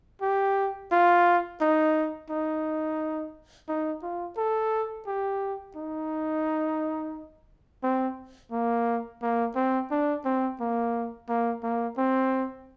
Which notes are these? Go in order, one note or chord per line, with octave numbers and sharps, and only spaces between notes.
G4
F4
D#4
D#4
D#4
F4
A4
G4
D#4
C4
A#3
A#3
C4
D4
C4
A#3
A#3
A#3
C4